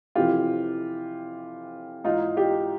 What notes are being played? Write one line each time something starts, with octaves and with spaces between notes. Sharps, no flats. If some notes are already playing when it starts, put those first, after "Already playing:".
F2 C3 E3 F4 G4
G#2 E3 D#4 F4
F4 G4